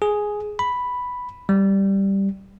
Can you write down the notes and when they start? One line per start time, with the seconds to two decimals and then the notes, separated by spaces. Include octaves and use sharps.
0.02 G#4
0.59 B5
1.49 G3